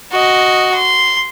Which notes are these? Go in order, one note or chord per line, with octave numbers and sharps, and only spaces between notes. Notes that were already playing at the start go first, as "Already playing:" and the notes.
F#4 D#5
C6